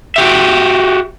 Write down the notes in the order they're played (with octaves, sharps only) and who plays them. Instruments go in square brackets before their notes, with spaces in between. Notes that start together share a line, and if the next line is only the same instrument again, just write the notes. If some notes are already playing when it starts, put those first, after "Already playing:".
[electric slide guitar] F#4 G4 E5